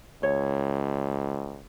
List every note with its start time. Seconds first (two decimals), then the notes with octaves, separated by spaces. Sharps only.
0.23 C#2 C#5